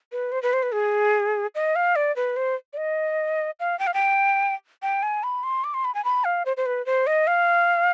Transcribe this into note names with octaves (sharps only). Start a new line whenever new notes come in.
B4
C5
B4
C5
B4
G#4
D#5
F5
D5
B4
C5
D5
D#5
F5
G5
F5
G5
G5
G#5
B5
C6
D6
C6
B5
G#5
B5
F5
C5
C5
B4
C5
D#5
F5